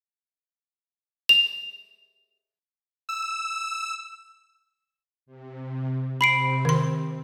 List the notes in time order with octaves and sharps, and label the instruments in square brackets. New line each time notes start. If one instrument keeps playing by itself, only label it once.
[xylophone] F7
[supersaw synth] E6
[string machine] C3
[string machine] C3 C4 [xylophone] B5 C7 D7
[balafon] D#3 C6